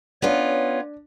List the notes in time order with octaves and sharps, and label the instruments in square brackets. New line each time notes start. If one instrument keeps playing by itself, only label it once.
[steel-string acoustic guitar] B3 C#4 F4 [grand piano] D4 [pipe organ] C#5